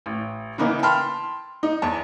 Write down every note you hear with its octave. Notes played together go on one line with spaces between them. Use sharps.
A1
C#3 E3 A#3 B3 D#4
G5 A5 B5 C6 F6
D#4
E2 A5